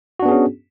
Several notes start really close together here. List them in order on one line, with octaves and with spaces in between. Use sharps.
F#4 D4 B3 G#4 C#4